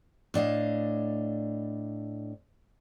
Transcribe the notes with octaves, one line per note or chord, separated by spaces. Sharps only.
A2 D4 D#5 F5